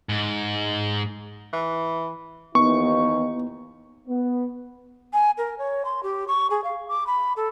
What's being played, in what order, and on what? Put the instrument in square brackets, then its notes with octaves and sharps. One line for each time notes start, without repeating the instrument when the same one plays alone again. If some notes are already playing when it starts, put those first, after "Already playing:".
[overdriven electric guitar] G#2
[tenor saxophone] E3
[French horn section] D#2 E3 D#4 [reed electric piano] B3 [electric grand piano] C#6
[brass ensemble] B3
[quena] G#5
A#4
C#5
C6
G4
C#6
G#4
F5
D6
B5
A4